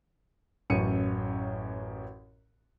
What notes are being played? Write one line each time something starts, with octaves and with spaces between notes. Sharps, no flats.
A1 F#2 C#5 C#7 D#7